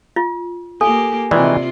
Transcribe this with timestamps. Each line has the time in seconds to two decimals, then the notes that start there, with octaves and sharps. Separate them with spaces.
0.16 F4
0.81 A#3 G4 A4 G#5
1.31 C3 D#3 E3 G#3 F4 D5